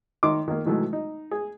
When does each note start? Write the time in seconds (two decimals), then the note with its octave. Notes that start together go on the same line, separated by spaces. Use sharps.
0.23 D#3 D#4 C6 D6
0.48 D#3 A#3
0.65 B2 D#3 E3 F#3 G#3 A3
0.93 D#4
1.31 G#4